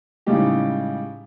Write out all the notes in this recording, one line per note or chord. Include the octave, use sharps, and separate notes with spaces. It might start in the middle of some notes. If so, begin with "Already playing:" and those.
A2 C#3 G3 G#3 D#4 G4